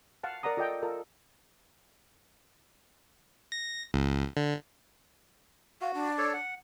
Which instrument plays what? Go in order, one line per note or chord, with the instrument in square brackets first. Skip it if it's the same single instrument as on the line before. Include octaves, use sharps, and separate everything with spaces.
[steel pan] F5 F#5 A5
A#4 D5 F#5 A#5 D#6
F4 A4 D5 D#5 G5 A#5
F4 A4 A#4
[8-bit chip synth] A#6
C#2
D3
[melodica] F#4 [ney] F5
[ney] D4
[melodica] A4 C#5 D5
F#5